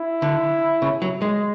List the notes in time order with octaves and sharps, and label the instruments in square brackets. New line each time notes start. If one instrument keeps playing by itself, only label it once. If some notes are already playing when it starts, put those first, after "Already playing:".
Already playing: [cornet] E4
[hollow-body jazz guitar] D3
C#3
F#3
G#3